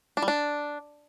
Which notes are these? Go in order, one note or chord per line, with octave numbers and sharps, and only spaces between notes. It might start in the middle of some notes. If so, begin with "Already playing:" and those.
D4
G3
D4